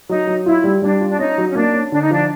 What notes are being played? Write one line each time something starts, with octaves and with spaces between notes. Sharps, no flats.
F#3 D#4
F#3
E4 F4
G3
G3 D4
F4
D4
C#4 D#4
F#3
C#4
A#3 D4
C#4
D3 D4
D#4
F3 D4